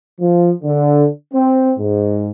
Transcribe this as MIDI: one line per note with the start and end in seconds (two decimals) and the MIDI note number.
0.19 0.51 53
0.63 1.06 50
1.33 1.72 60
1.78 2.31 44